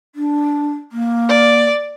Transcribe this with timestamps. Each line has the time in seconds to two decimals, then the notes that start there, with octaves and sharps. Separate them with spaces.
0.15 D4
0.92 A#3
1.29 D5